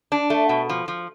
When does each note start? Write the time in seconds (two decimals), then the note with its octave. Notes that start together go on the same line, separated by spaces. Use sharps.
0.12 D4
0.30 A3
0.49 B2
0.70 F3
0.88 F3